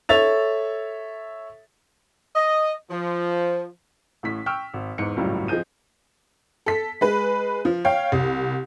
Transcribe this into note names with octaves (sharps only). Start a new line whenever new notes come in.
A4 C#5 E5 A6 F7
D#5
F3
A1 A2 B6
G5 C#6 E6 F6
G#1
E2 G#2 C#7
G#1 C#2 F#2 A2 F#3 G3
F3 C4 G#4 D#5 G6 D#7
A4 B6
G#3 B4
F3
C#5 F5 G5
C2